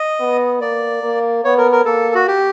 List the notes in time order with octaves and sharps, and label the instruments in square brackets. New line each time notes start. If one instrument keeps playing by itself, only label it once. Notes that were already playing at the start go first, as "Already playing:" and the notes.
Already playing: [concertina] D#5
[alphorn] B3
[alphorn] A#3 [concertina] D5
[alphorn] A#3
[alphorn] B3 [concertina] C#5
[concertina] A#4
A#4
[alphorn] A#3 [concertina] A4
[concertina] F#4
G4